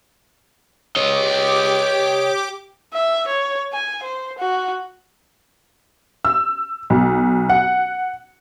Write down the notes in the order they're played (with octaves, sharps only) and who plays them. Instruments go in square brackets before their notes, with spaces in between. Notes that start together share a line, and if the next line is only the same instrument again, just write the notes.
[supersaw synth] G4 D6 [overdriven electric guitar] C#5 D#5
[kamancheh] E5
C#5
G#5
C5
F#4
[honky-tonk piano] E6
B1
F#5